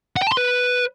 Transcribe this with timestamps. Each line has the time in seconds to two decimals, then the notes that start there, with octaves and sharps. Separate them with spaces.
0.17 F#5
0.22 G5
0.27 A5
0.32 C6
0.37 B4